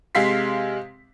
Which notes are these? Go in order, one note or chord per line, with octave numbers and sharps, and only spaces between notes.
C3 G#3 F5 C6 B6 C7